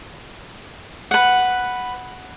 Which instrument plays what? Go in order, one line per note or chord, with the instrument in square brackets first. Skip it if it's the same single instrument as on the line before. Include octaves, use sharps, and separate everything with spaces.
[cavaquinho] B4 F#5